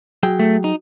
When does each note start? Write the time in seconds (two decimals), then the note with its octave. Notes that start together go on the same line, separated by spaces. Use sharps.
0.23 F#3 G#4 G5
0.39 A3
0.64 D#4